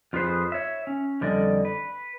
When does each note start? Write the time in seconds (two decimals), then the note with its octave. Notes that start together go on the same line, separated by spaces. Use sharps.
0.13 F2 F4 G#4 B4 C5
0.52 C#5 E5
0.87 C#4
1.21 F2 D3 G3 D5 D#5
1.65 B4